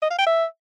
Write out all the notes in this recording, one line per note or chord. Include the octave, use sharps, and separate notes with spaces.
D#5
F5
G5
E5